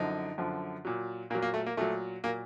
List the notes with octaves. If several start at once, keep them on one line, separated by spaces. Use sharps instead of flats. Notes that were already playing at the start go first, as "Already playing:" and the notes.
Already playing: F#2 D3 F3 D#4
F#2 D3 F3
A#2 F#3
A#2 F#3 A#3
A#3
A3
A#3
A#2 F#3 A3
A#2 F#3 A#3